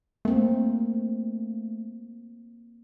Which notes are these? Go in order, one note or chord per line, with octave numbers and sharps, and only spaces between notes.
A3 A#3 C4